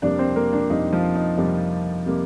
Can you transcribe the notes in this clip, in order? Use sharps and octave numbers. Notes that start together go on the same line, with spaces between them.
F2 C3 G3 A#3 D4 D5
C4 C5
A#3 A#4
D4
F2 C3 G3 A#3 D#4
F3 F4
D#4
F2 C3 G3 A#3
C3 G3 A#3